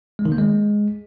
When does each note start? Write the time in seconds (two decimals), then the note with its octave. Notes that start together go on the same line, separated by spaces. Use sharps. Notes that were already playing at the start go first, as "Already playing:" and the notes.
0.19 G#3
0.25 D#3
0.32 A#3
0.38 G#3